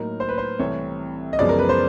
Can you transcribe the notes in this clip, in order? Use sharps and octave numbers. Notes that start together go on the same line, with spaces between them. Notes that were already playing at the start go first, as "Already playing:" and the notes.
Already playing: A2 F#3 A#3 D#4 A#4
C5
B4
C5
C2 C3 E3 A3 C#5
D#5
F#2 C#3 F3 G#3 B3 D5
A#4
B4
C5